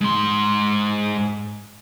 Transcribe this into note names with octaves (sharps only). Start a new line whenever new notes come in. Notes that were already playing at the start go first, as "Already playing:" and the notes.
G#2 C6